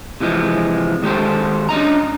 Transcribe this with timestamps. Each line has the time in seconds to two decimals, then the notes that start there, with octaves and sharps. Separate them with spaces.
0.20 C3 E3 F3 G#3
1.02 D#3 G#3 G4 A4 C5
1.69 C#4 D4 D#5 A#5